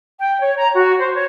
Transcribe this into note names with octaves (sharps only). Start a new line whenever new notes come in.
G5
C#5
A#5
F#4
C5
C#5